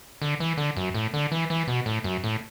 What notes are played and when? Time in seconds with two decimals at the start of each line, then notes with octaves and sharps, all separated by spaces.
0.22 D3
0.40 E3
0.57 D3
0.77 F#2
0.94 A2
1.14 D3
1.32 E3
1.50 E3
1.68 B2
1.86 A2
2.04 F#2
2.24 A2